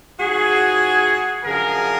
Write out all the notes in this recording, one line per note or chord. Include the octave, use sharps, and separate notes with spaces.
G#2 F3 F#4 G#4
F#2 D3 F3 G#4 A#4